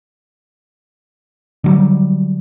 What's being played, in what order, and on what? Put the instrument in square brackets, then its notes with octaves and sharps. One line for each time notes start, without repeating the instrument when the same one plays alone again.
[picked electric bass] D3 F#3 G3